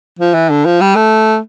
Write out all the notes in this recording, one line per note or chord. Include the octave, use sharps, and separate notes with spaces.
F3
E3
D3
F3
G3
A3